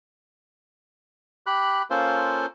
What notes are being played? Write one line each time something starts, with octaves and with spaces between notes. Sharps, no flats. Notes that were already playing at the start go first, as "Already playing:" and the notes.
G4 B5 F#6
A#3 C#4 F4 A4 C5